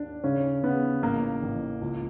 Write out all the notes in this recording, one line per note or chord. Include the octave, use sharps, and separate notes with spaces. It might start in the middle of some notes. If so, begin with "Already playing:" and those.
Already playing: D#2 D4
C#3 C#4
C#3 B3
A1 A#3
A1
C#2